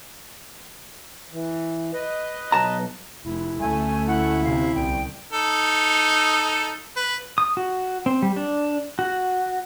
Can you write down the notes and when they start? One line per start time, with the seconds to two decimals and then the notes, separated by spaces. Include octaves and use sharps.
1.33 E3
1.94 B4 D#5
2.52 B1 A5 A#5
3.25 F1 E4
3.60 D2 A3 C#4 G#5
4.07 E4 F#5
4.44 C3 F5
4.75 C2 G5
5.32 D#4 A4
6.96 B4
7.38 D#6
7.57 F#4
8.06 C4
8.22 G3
8.36 D4
8.99 F#4